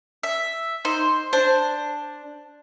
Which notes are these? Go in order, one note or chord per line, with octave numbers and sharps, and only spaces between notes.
E5
D#4 C5
D4 C5